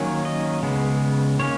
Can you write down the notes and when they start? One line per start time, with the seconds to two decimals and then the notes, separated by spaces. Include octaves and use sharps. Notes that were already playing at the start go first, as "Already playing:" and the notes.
Already playing: D#3 F#3 A#3 C#4
0.25 D#5
0.63 C#3 G#3 B3
1.39 D#3 A#3 C#4 C#5